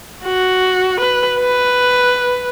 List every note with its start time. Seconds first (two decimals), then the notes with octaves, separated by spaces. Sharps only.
0.24 F#4
1.00 B4
1.40 B4